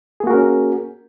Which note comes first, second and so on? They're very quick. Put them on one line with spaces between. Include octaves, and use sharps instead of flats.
G#4 A#3 F#4 A#4 C#4